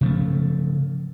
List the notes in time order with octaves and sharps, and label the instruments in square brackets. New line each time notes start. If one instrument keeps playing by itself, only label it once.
[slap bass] C#3 F3 A3